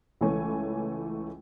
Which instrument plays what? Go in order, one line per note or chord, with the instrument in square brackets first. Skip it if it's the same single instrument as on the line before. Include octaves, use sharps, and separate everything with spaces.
[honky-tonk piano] C#2 E3 A3 C#5 G#5